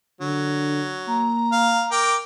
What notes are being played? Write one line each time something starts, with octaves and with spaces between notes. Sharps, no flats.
D3 F#3
A#3 A#5
F5
A#4 G5 D6